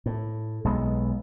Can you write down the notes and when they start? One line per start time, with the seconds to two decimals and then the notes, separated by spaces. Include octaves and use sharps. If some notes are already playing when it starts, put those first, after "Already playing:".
0.06 A2
0.65 B1 G#3 B3